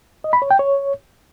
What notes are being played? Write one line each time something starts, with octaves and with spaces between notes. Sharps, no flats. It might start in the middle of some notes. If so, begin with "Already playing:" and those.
D#5
B5
C#5
G5
C#5